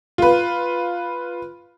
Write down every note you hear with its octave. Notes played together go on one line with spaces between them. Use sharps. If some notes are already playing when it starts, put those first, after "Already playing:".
F4 B4